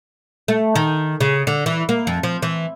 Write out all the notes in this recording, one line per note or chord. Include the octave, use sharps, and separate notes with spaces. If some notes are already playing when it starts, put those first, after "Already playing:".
A3
D#3
C#3
D3
E3
A#3
F2
F3
E3